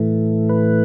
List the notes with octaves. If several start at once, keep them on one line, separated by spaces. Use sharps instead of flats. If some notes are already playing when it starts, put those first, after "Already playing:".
Already playing: A2 E3 A3
B4